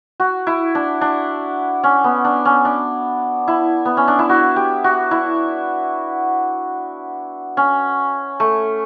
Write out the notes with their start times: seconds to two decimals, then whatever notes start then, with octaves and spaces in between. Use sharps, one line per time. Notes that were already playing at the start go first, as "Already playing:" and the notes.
0.20 F#4
0.47 E4
0.75 D4
1.01 D4
1.84 C#4
2.04 B3
2.25 D4
2.45 C#4
2.65 D4
3.48 E4
3.85 B3
3.97 C#4
4.08 D4
4.19 E4
4.29 F#4
4.56 G4
4.84 F#4
5.11 E4
7.57 C#4
8.40 A3